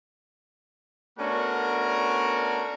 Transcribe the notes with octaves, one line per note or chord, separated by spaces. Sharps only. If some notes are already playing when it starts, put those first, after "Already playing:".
A3 B3 C#4 D4 F#4 A#4